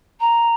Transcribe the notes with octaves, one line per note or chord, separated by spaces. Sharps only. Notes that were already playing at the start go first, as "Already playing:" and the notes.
A#5